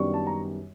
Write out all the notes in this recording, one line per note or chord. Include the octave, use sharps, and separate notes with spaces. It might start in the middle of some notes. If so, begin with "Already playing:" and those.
Already playing: F#2 D#3 G3 B3 D4 C#6
A5
A#5